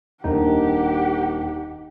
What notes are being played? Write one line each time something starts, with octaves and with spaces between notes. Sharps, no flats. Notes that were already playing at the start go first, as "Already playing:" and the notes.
D#1 A#3 D4 D#4 G4 F#5